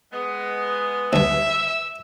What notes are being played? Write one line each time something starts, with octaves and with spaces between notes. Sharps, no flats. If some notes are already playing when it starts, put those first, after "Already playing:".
G#3 B3
D2 G2 E5 E6